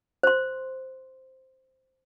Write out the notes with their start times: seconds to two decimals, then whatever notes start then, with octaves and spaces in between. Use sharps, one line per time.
0.23 C5 C6